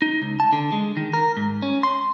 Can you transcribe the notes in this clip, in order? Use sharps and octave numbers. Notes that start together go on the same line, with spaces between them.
D#4
C#2
A5
D3
G#3
D#3
A#4
G#2
C#4
C6